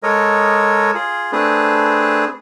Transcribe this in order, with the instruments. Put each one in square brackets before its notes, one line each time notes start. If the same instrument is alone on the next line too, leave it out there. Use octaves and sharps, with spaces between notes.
[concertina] G#3 A4 A#4 C#5 D#5
F4 G#4
A3 C4 D4 G#4 B4